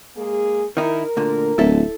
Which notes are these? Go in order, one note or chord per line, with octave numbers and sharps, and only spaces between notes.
G#3 A#3 G#4
D#3 D#4 E4 A#4
D2 A#2 D3
D1 E4 A4 E5